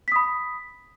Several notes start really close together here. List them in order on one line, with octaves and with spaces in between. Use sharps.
B6 D#6 B5